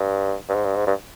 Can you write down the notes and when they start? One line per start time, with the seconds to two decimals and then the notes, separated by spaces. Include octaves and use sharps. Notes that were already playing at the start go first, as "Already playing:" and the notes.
Already playing: G2
0.49 G2
0.54 G#2
0.65 G2
0.76 G#2
0.87 G2